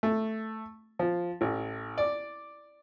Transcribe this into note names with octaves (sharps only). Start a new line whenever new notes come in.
A3
F3
A1
D5